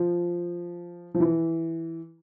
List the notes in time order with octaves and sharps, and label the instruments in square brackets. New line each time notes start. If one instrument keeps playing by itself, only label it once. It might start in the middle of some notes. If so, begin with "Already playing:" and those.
Already playing: [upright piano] F3
F3
E3